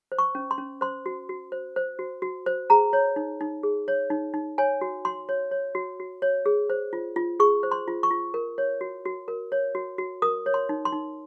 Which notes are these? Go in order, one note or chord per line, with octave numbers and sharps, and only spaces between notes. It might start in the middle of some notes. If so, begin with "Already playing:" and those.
C5
C#6
C#4
C6
C#4
C5 C6
F#4
F#4
C5
C5
F#4
F#4
C5
G#4 A#5
C#5
D#4
D#4
G#4
C#5
D#4
D#4
C#5 G#5
F#4
F#4 C6
C#5
C#5
F#4
F#4
C#5
G#4
C5
F4
F4
G#4 C#6
C5
C6
F4
C#6
F4
A#4
C#5
F#4
F#4
A#4
C#5
F#4
F#4
A#4 D#6
C#5
C6
D#4
C6
D#4